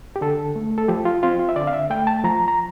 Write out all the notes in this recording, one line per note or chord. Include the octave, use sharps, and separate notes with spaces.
G4
D3 A4
A3
A4
F3 G4
F4
C4 F4
F4
E5
D3 D5
F5
E5
A3 G5
A5
F3 A#5
A#5